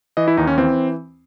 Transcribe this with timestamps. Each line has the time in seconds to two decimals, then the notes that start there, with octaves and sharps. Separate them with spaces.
0.17 E3 D#5
0.28 E4
0.37 D#2 D#4
0.47 C#4
0.58 E3 C4